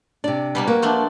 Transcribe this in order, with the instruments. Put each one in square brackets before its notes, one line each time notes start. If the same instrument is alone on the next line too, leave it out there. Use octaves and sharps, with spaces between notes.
[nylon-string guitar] C3 D4 [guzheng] D5
[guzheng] B2 G3 A#3
[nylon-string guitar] A#3 [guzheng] F#4
[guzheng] F3 A3 D4